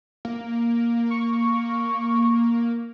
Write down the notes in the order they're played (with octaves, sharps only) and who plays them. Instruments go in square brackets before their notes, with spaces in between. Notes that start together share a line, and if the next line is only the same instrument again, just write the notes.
[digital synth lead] A#3
[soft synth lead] C#6